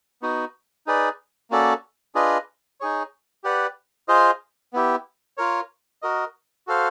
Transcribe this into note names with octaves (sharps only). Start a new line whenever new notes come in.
B3 D#4 F#4
D#4 G#4 B4 D5
A#3 C#4 F#4 A4 D5
D4 F4 G#4 B4 D#5
D#4 G#4 C#5
G4 B4 D5 F#5
F4 G#4 C5 D#5
B3 E4 G4
F4 A#4 C#5
F#4 A#4 D#5
F#4 A4 C5 F5